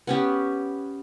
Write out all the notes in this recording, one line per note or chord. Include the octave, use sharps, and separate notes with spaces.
B3 C#4 G4